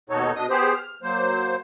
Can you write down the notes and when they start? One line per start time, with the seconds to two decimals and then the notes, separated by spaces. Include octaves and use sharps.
0.10 D#2 B2 D#4 F#4 A4 C#5
0.36 B2 D4 D#5 D#6
0.49 B3 G4 G#4 C5
0.74 F6
1.03 F#3 A#3 C5